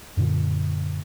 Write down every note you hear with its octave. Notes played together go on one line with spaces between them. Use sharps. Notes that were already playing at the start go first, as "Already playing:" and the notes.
F#2 A#2 D3